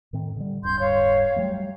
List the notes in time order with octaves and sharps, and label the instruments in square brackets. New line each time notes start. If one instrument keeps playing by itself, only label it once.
[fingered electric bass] A2 D#3 C4
D3 G3
[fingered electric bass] D1 G2 [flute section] C6 G6
[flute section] C#5 F5
[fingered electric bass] F#3 G3 A3